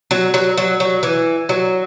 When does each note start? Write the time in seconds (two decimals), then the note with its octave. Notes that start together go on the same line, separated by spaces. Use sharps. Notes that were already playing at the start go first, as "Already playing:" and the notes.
0.11 F#3
0.34 F#3
0.57 F#3
0.80 F#3
1.03 E3
1.49 F#3